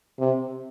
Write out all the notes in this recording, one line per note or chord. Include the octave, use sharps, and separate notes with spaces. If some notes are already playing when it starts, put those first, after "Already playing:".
C3